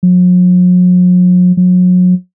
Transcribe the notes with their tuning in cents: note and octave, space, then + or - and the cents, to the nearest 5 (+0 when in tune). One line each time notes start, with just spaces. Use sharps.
F#3 -45
F#3 -35